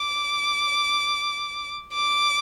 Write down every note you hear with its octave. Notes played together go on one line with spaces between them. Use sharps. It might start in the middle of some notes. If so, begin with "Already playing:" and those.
Already playing: D6
D6